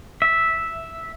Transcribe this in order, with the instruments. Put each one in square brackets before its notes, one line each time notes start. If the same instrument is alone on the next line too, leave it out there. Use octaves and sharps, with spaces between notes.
[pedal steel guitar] E5